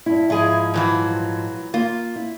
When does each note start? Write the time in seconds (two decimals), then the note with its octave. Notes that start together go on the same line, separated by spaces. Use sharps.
0.06 G2 E4
0.30 G#2 F3 E4 G#4
0.74 A#2 E3 F#3
1.74 A#3 F4
2.16 E4